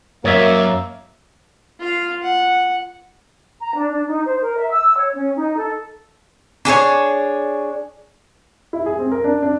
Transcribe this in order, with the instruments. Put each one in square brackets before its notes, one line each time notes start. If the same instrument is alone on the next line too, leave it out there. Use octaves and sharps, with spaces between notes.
[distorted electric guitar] F#2 [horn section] A#3 [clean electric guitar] C#5 D#5 E5
[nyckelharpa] F4 F5
F#5
[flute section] A#5
D4
D4
D#4
C5
A#4
E5
E6
C#5
C#4
D#4
A4
[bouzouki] D4 G#4 A4 C#5
[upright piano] E4
G#4
C4
A#4
D4
D4